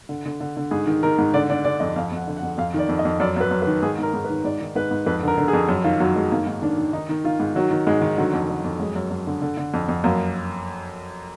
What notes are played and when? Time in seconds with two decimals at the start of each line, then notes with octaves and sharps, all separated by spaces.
0.09 D3
0.26 D3
0.41 D3
0.57 D3
0.71 G#2 G#4
0.87 D#3
1.03 D#3 A#4
1.19 G#2
1.34 D3 D5
1.49 D3 D5
1.65 D3 D5
1.80 F2 D#5
1.96 F2 F5
2.12 F2 F#5
2.28 D3
2.37 F#5
2.43 F2
2.58 F2 F5
2.74 D#3 D5
2.89 F2
2.99 D#5
3.05 F2
3.20 F#2 D5
3.36 F#2 B4
3.51 F#2
3.62 B4
3.67 D#3
3.82 G#2 G#4
3.98 G#2 A#4
4.14 G#2
4.25 B4
4.30 D#3
4.44 G#2 D5
4.61 D#3
4.76 G#2 B4
4.91 G#2
5.06 F2 B4
5.23 D3 A#4
5.38 D3
5.48 G#4
5.53 F2
5.69 F#2
5.84 D#3 F4
6.00 F#2 F#3
6.15 F#2 G#3
6.32 D#3 A#3
6.47 G#2
6.62 D#3 D4
6.78 D#3
6.93 D#3 D#4
7.09 D#3
7.24 D#3 F4
7.40 G#2
7.55 D#3 F#3
7.71 D#3
7.87 G#2 G#3
8.02 D#3
8.17 D3 F#3
8.34 F2
8.48 D3
8.64 F2
8.79 F#2 G#3
8.96 F#2
9.11 F#2
9.27 D3
9.42 D3
9.57 D3
9.74 F2
9.89 F2
10.04 F#2 A#3